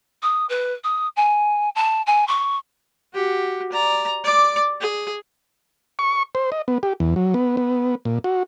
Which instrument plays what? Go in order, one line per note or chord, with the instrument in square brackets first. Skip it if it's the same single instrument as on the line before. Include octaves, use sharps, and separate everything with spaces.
[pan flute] D#6
B4
D#6
G#5
A5
G#5
C#6
[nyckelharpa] F#4 G4
D5 A#5
D5 D6
G#4
[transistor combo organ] C#6
C5
D#5
B3
G4
E2
F#3
B3
B3
A#2
F#4